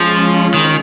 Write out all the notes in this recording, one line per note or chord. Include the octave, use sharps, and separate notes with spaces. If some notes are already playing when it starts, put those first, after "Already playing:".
Already playing: F3 G#3 C#4 F4
D#3